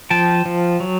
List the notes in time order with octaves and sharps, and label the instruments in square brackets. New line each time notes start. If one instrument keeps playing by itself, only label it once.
[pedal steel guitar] F3 G5 A5
F3
F#3